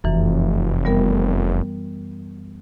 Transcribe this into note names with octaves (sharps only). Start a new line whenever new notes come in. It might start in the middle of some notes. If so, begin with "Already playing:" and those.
F1 F#2 E3
G3 B3 A#4